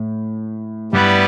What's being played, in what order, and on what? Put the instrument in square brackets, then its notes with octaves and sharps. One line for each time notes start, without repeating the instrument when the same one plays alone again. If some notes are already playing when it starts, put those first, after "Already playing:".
Already playing: [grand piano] A2
[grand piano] G2 [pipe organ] G3 B3 E4 B4 D5